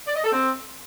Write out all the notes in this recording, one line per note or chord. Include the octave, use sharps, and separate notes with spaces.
D5
D#5
A4
C4